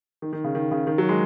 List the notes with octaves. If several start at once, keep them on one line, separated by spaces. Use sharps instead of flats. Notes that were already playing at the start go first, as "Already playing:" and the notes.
D#3
D#3
C#3
D#3
C#3
D#3
F#3
G#3